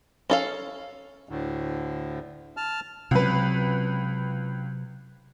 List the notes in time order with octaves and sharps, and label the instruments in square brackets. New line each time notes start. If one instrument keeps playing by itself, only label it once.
[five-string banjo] C#4 A4 F5
[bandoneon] D2 A2 D3
A5 F6
[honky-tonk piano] C#2 B4 [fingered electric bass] C3 F#3